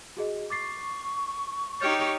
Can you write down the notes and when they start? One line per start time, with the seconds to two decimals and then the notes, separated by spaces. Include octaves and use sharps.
0.17 F#4 G#4 D#5
0.50 C#6 D6 A6 C7
1.81 D#4 G4 C#5 F6 G6 A6